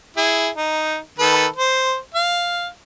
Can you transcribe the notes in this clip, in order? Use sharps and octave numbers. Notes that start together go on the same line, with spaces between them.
E4 G#4
D#4
D#3 A4 B4
C5
F5